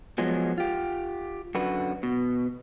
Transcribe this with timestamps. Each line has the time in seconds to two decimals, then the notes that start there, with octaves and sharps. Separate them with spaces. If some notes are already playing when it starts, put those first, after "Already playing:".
0.18 F3 F#3 G#3 B3
0.58 F4 G4
1.55 F#2 D3 F#4 B4
2.03 B2